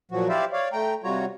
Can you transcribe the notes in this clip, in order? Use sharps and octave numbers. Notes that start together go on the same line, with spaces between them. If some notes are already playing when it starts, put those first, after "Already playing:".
A#2 F3 F#3 F#4
E4 G4 C5 D5 E5 F5
C#5 D5 F5
A3 G5 A#5
C3 G3 F4 F#4 C#5 A#5